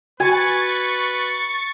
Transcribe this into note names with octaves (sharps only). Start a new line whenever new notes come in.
F#4 B4 G#5 C#6 A6 C#7